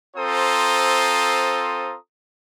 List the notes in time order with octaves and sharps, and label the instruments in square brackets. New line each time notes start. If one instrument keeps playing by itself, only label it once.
[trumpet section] C4 F4 A4 C5 A#5 D#6